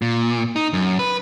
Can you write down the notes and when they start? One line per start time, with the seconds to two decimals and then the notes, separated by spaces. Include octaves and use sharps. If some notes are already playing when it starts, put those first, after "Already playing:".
0.02 A#2
0.56 D#4
0.73 F#2
0.99 B4